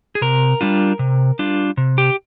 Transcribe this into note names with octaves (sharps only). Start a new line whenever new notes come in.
G#4
C3 A#4
G3 D4 F4
C3
G3 D4 F4
C3
G4